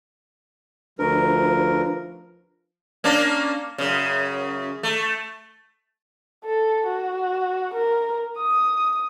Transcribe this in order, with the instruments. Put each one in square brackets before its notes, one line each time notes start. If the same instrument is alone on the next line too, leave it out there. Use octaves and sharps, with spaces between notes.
[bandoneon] D2 A#4 [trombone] F3 [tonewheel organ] D4 B4
[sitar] A#3 C#4 D4
F#2 C#3
A3
[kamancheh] A4
F#4
A#4
D#6